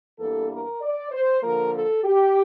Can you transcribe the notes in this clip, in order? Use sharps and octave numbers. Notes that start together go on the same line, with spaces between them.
E2 E3 G3 A#3 D4 A4
A#4
D5
C5
D3 F3 A#3 A#4
A4
G4